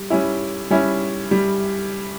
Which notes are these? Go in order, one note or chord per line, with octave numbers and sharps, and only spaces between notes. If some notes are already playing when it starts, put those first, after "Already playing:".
Already playing: G3
G3 C#4 E4
G3 C#4 E4
G3